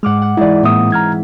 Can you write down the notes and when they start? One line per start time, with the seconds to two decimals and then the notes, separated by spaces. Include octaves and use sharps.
0.03 G#2 G#3 F#5 D6 F6
0.22 F#5
0.37 G#2 E3 E4 D5
0.63 A2 A#3 C4 E5 D#6
0.92 A#5 F6 G#6